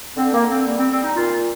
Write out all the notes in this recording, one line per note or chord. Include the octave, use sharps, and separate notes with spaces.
D3 C4
A#3
D3
C4
G3 A#3
C4
G3 C4
D#4
A#2 F4